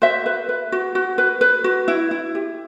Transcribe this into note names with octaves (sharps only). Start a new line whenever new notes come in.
F#4 C5 E5
B4
B4
F#4
F#4
B4
B4
F#4
E4
E4
G4